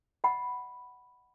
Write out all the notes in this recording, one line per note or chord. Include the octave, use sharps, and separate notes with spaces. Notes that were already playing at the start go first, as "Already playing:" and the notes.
D#5 F#5 B5